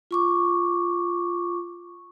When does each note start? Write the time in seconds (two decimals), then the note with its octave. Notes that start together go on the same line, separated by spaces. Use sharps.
0.11 F4 C#6 D6